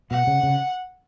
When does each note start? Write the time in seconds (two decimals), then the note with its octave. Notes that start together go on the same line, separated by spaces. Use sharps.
0.10 B2 F#5
0.27 C#3
0.43 C#3